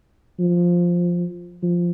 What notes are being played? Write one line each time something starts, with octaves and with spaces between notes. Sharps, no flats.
F3
F3